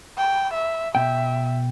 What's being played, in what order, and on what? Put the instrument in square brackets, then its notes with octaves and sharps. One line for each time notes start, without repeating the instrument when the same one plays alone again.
[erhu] G5
E5
[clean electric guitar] B2 G5 [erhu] E5